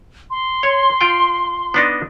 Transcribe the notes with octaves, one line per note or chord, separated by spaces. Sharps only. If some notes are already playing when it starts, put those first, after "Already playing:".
C6
C#5
F4 G5
B3 D4 D#4